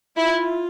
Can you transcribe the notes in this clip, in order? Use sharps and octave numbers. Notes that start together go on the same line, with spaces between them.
E4 F4